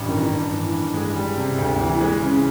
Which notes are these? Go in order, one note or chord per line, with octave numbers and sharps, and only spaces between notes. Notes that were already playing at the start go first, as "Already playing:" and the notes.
Already playing: A1 G2 G3
D#3
G2
E3
G2
G#3
G3
C3
D2
E3
G#3
C#3